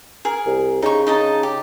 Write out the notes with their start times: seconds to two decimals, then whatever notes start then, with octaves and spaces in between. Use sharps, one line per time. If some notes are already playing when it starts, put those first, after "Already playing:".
0.25 G#4 A#4
0.46 C2
0.82 C#3 D#4 G#5 C#6
1.07 D#4 D#5 A5
1.43 G4